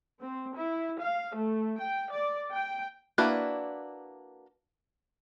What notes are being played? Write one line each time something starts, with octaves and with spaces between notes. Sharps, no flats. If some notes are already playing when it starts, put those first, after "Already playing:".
C4
E4
F5
A3
G5
D5
G5
A#3 D4 E4 F#4 B4